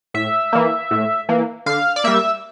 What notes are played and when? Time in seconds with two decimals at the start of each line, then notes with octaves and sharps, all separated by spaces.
0.14 A2 E5
0.53 E3 A#3
0.91 A2
1.29 E3 A#3
1.66 D3 F5
1.96 D5
2.04 G3 A#3 E5